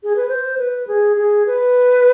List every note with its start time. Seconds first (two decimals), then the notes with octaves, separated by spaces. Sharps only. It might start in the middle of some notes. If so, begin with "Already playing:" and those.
0.03 G#4
0.16 B4
0.28 C5
0.58 B4
0.87 G#4
1.17 G#4
1.46 B4